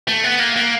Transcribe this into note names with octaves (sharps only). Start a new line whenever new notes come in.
A3
B3
A#3
A#3